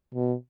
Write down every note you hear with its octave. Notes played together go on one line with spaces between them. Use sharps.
B2